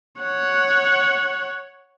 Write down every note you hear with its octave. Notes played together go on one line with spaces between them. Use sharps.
C#5 F#5